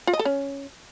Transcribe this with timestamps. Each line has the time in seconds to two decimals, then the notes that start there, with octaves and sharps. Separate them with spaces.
0.07 F4
0.13 D#5
0.19 A4
0.25 C#4